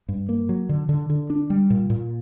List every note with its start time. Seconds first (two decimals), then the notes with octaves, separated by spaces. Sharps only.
0.08 G2
0.29 A#3
0.49 F#3
0.69 D3
0.89 D3
1.10 D3
1.30 D4
1.50 G3
1.70 A#2
1.90 A#2